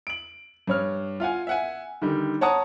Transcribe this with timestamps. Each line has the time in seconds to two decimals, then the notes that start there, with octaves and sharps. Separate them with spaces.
0.07 D7 F#7
0.67 G2 C#5 F6
1.20 F4 F5 F#5 G#5
1.47 E5 F#5 G#5
2.02 D3 D#3 G3
2.41 C#5 F#5 A5 A#5 D#6